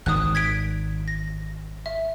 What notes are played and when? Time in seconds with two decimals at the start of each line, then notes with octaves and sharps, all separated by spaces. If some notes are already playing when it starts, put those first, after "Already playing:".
0.06 G#1 D#3 D#6 F#6
0.35 G#6 B6 D7
1.08 A#6
1.86 E5